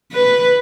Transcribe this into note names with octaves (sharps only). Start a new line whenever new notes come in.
B4